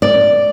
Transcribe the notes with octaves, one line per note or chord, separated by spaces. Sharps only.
D5